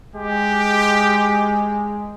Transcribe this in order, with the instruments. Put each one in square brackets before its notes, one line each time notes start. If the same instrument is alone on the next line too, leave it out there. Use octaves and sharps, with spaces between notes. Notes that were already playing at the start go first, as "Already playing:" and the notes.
[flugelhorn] G#3 [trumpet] G4